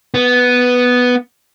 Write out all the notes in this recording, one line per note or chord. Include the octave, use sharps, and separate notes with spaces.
B3